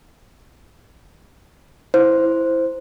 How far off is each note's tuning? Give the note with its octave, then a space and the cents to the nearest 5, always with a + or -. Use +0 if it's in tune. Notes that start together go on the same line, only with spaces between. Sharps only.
E4 +0 C5 +0